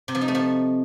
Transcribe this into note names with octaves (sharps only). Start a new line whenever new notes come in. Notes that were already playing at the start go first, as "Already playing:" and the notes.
C3
F3
D#4
A3
F3